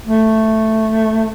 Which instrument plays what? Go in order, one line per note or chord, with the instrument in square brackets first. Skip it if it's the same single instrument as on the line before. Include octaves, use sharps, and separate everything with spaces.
[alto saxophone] A3